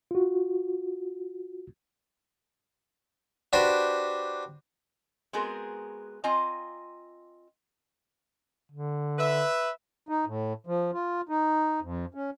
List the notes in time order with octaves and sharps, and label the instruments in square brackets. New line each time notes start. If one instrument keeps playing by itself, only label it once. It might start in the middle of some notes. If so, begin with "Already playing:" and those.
[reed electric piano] F4 F#4
[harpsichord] D4 F#4 G4 B4 C5
[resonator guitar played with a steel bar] G#3 B3 C4 F#4 G#4 A#4
C4 F4 D#5 G#5 A#5
[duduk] D3
[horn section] B4 E5
[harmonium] D#4
A2
F3
F4
D#4
F2
C#4